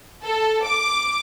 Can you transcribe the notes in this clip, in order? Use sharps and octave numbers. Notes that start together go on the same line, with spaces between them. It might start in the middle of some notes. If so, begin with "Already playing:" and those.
A4
D6